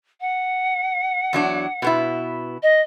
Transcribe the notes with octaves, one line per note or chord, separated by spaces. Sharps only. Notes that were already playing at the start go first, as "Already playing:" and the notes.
F#5
E2 F#3 D4
B2 B3 E4
D#5